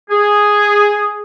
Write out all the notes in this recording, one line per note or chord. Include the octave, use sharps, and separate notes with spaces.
G#4